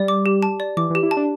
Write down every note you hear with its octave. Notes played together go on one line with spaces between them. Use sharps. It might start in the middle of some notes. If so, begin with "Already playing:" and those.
Already playing: G3 D5
D6
G4
A5
D5
E3 D6
E3
G4
E4
A5
D4